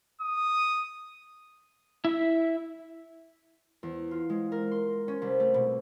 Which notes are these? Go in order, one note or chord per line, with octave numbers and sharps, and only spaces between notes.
D#6
E4 E5
E2
F4
G#3
A#4
C6
C#4
C2
A3
B2